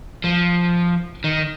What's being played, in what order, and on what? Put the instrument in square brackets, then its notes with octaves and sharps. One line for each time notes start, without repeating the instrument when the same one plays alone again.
[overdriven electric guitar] F3
D#3